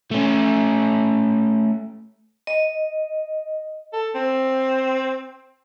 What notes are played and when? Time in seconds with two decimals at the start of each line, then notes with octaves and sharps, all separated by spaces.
0.11 A3 C#4
2.47 D#5
3.93 A4
4.15 C4